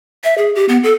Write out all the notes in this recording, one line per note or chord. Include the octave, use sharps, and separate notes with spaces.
E5
G#4
G4
B3
A4